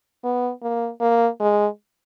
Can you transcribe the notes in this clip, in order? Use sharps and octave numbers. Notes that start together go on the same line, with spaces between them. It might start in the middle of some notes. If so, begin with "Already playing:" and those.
B3
A#3
A#3
G#3